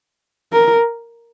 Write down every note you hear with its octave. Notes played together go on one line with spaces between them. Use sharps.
A#4